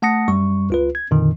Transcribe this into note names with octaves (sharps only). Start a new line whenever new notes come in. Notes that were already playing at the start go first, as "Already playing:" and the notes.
A3 F#5 A5 D#6 A#6 C#7
F#2 G3 C#6
C#2 F4 B4
G#6
F2 A#2 D3 D#3